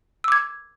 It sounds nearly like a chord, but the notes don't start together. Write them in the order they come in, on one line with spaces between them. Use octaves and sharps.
E6 D6 G#6